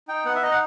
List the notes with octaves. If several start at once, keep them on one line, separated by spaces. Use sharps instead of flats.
D#4 G5
B3 F#5
E5
D#4 D#5
F#5